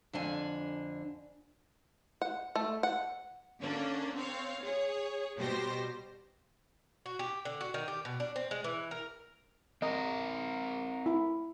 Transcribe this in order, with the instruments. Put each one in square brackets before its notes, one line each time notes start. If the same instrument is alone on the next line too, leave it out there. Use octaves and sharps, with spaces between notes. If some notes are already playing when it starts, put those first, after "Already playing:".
[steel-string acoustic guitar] F2 D3 D4 G#5
[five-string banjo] F#5
A3
F#5
[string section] D3 A#3 C#4 D4
C4 C#5 F5
G#4 C#5
B2 G3 G4 C5 A#6
[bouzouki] F#4
G4
D3
F#4
D#3
G4
B2
D4
C4
G#3
E3
A#4
[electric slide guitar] C4 A#4 [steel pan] D#5
[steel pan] E4